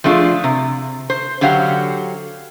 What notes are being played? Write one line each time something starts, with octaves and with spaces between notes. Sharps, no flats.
F3 A3 D4 F4 G#4
C3
C5
D3 F#3 G4 F5 F#5